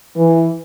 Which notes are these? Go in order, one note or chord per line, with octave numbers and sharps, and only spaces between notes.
E3